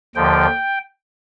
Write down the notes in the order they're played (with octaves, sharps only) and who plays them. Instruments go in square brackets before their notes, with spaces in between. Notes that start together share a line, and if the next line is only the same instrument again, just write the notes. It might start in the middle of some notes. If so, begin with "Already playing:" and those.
[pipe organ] D#2 D3 F3 G5